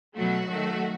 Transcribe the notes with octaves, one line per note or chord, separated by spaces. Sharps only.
B2 F#3 A3 F#4
D#3 F#3 A3